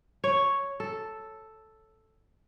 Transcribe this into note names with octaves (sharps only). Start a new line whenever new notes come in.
C#5
A4